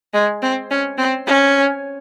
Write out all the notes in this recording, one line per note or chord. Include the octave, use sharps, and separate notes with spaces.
G#3
C4
C#4
C4
C#4